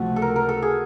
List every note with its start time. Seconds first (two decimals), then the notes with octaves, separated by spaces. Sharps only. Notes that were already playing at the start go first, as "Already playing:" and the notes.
Already playing: C#2 C3 F3 A3 F#4
0.16 A4
0.22 A#4
0.36 A#4
0.49 A4
0.62 G#4